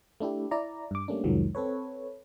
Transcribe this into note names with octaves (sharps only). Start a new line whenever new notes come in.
A3 D4 E4 G4
E4 D5 A#5
G2 D6
G3 A3 A#3 C#4 D4
C2 F2 D#3 F3 F#3 G#3
C4 A4 B4 C#5